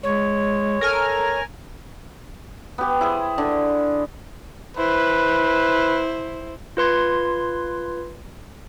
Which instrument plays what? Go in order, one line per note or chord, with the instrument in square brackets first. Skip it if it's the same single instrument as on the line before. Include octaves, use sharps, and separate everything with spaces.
[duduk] G#3 [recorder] C#5
[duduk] A4 [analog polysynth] A#4 G#5 F6
[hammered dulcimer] B3 G4
E4 G#4 C5
D3
[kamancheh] E4 C5 [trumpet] B4
[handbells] F4 B4 C6 G#6